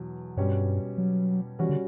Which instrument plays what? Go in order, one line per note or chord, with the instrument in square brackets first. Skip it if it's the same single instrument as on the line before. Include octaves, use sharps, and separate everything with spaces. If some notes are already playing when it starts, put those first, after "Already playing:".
Already playing: [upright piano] E2 B2 F#3
[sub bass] G2 [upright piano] B2 G3 C#4 G4 C#5
[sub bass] F#3
[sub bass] E3 [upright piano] G3 C#4 F#4
[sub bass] D3